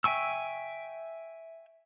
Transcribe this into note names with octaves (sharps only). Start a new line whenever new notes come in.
E5 G5 G#5 C#6 E6